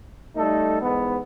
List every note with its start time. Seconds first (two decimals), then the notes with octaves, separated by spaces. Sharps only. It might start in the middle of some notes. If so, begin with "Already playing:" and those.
0.36 G3 A3 D#4 A4
0.81 E2 G#2 B3